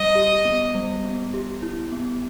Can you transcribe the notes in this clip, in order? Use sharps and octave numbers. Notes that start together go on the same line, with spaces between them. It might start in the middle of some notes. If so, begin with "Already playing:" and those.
Already playing: G3 D#5
G4
B3
G3
B3
G4
E4
B3